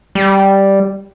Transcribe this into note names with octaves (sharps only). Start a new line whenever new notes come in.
G3